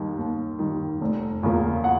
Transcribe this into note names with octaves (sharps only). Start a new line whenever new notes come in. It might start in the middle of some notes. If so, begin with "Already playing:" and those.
Already playing: D#2 D#3 G3
D#2
D#3 G3
F1
E2 C#3 F3 A#3
F#5